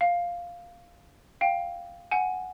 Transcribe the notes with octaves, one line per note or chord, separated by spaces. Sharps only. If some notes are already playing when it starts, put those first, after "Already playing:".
F5
F5 G5
F#5 G#5